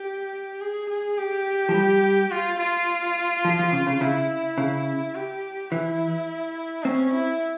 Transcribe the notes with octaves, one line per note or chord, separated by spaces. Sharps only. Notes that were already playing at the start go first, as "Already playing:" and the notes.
Already playing: G4
G#4
G#4
G4
F3
G3
F4
F4
F3
F3
C#3
C#3
C#3 E4
C#3
G4
E3 E4
C4 C#4
E4